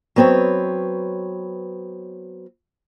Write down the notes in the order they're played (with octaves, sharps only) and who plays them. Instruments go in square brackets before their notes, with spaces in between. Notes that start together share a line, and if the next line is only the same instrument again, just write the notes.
[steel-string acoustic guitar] F#3 B3 C4 B4 C#5